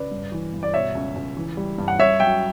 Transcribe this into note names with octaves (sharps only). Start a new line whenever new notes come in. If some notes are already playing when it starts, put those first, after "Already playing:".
Already playing: C#3 B4 D5
G2
E3
G2
D5
B2 C#5 E5
C#2
C#2
E3
G3
G2
F#5
G2 C#5 E5
F#3 E5 G5